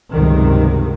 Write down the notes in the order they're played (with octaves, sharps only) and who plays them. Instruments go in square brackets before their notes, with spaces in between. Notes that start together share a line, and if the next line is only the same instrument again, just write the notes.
[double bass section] C#2 G2 C3 D#3 F#3